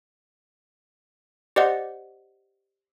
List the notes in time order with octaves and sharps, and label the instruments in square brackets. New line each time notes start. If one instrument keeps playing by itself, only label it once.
[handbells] G4 C5 D5 D#5 F#5